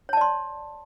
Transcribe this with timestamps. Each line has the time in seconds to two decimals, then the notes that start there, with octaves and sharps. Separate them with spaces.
0.09 C#5
0.13 A5
0.17 D5
0.21 C6